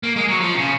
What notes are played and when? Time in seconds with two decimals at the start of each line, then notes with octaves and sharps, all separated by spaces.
0.03 A#3
0.16 G#3
0.29 F#3
0.41 F3
0.55 C3
0.59 C#3